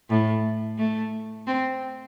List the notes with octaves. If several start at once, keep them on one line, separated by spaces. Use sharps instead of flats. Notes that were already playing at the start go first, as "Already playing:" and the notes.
A2
A3
C4